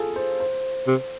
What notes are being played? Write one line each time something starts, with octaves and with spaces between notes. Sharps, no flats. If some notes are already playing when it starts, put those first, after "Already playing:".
Already playing: F4 G#4 A4
C5
C5
C3